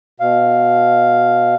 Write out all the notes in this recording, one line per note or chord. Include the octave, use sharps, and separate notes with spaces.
B2 F5